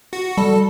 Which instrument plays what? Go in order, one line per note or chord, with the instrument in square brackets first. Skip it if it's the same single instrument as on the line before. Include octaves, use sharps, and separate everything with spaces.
[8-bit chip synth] F#4
[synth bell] G3 [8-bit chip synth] A4